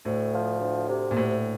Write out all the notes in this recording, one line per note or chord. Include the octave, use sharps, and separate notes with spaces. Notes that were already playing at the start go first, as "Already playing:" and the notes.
D2 A2
F3
D2
C3
A#2
D2 A2